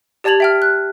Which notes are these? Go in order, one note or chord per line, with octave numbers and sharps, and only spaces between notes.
G4 D5 A5 G#6 F7 F#7
E5 G5 F6
F#6